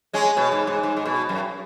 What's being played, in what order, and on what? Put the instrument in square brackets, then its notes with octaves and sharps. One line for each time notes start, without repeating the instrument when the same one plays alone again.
[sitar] G#3 C#4
B2
G#2
G#2
G#2
G#2
B2
F#2